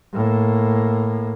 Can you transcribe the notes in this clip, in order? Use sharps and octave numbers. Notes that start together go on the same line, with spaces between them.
A2 A#3